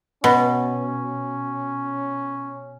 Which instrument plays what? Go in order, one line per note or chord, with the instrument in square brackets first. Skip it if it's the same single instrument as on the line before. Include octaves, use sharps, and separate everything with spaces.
[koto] B2 [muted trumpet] C#4